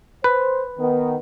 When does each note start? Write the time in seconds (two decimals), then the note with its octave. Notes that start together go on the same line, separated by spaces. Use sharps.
0.24 B4 C5
0.78 D#3 B3